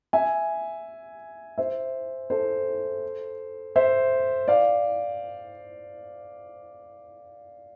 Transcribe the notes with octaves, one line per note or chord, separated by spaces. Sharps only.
E5 G#5
C5 E5
A4 C5
C5 E5
D5 F5